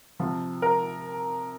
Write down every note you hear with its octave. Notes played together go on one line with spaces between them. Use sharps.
C3 F3
A#4